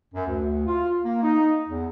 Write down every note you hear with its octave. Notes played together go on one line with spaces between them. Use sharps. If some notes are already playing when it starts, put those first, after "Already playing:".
F#2
D2
F4
A#3
D#4
E2